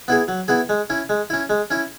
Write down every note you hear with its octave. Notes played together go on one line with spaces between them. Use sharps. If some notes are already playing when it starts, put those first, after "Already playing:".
B3 E4 G#4
F#3
B3 E4 G#4
G#3
C#4 E4
G#3
C#4 E4
G#3
C#4 E4